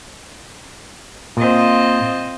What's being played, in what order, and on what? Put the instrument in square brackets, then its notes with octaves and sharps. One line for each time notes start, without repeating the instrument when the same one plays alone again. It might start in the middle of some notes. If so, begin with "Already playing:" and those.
[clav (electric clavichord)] A#2 [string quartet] C4 F4 D#5